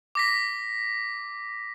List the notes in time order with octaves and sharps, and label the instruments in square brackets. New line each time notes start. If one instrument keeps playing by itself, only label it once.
[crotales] D6 A#6 B6